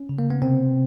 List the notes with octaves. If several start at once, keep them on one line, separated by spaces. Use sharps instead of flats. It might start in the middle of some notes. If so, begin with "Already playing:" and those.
Already playing: C#4
C#3
A#3
B3
C3 C4